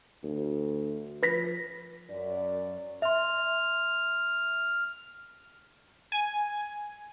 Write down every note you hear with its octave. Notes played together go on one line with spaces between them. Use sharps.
D2
F3 B4 A#6 B6
F#2 D5
E5 C6 F6
G#5